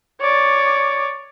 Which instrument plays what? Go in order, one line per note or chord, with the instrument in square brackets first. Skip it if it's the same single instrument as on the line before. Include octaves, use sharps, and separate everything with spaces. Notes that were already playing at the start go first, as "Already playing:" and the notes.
[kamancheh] C#5 D5